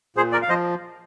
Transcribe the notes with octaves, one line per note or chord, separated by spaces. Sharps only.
A#2 G#4 C5
A#4 D5
F5
F3 C5 D#5